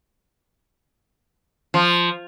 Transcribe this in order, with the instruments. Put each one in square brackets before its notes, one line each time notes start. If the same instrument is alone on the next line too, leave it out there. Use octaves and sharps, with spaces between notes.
[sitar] F3